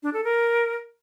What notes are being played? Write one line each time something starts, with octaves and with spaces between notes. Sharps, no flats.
D4
A4
A#4